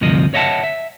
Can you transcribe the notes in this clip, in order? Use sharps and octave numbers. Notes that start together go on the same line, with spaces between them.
D2 G2 C3 F3 D#5
C#5 D#5 E5 F#5 A5
E5